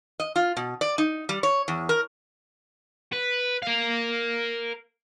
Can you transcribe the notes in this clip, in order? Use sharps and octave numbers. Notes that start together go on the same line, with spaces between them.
D#5
F4
B2
D5
D#4
G3
C#5
E2
A#4
B4
A#4 F5